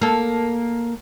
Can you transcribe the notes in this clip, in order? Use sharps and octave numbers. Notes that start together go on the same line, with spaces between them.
A#3 A4